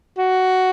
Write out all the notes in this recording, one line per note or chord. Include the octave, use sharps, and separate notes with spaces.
F#4